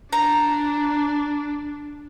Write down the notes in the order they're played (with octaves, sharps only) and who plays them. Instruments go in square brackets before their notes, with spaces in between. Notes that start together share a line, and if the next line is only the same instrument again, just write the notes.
[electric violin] D4 [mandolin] A#5